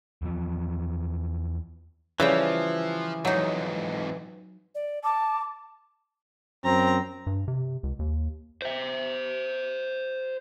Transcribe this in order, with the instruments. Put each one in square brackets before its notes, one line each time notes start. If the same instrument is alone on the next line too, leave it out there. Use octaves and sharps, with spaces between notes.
[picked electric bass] E2 F3
[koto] C#3 G3 G5 [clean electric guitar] E3 [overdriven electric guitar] F3
[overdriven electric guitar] F2 G#2 [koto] F#3 D#4
[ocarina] D5
[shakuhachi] A5 [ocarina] D6
[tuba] F#2 [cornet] C4 [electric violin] A#5
[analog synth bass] G2
C3
C#2
D#2
[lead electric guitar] C5 E5